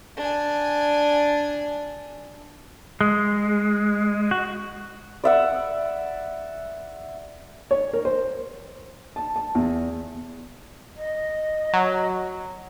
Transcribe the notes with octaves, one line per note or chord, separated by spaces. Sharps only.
D4 G#5
G#3
F#4
D5 E5 F#5
C#5
A#4
C5
A5
A5
E2
D#5
F#3